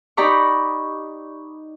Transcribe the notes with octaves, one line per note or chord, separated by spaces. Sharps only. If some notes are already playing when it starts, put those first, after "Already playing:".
D#4 G4 D5 A#5 B5 C#6